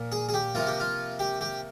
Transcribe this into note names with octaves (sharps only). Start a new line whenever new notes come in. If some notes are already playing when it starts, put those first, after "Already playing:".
Already playing: A#2 F3 A#3
G#4
G#4
G4
C3 F3 A#3 F4
G4
F4
G4
G4